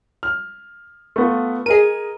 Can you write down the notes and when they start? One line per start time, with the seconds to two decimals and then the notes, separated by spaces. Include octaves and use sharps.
0.23 F6
1.16 A3 B3 F4
1.66 G#4 A#4 D#5 D#7